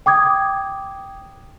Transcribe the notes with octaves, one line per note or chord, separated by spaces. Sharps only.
G5 D6 D#6 G#6